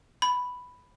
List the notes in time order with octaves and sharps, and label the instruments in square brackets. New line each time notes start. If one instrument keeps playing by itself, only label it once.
[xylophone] B5